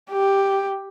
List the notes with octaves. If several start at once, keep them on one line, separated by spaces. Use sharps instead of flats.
G4